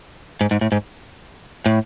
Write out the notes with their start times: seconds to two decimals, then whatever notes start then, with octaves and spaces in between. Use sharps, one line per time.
0.41 G#2
0.51 G#2
0.61 A2
0.72 G#2
1.66 A2